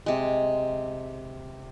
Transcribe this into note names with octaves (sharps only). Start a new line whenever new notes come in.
C3 G#3